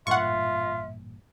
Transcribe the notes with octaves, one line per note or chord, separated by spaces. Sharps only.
A1 G2 A#2 F4 E5 F#5 C#6